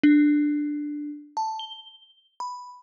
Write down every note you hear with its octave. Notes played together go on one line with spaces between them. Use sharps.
D4
A5
G7
B5